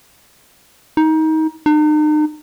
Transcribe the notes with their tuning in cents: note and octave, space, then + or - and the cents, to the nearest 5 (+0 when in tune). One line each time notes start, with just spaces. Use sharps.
D#4 +25
D#4 -40